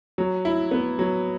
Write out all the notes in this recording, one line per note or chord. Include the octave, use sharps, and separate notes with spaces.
F#3
E4
B3
F#3